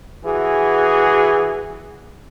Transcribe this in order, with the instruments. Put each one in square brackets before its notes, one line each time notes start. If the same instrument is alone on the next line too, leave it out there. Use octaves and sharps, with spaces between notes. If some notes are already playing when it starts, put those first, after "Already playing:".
[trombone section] E3 F#4 G#4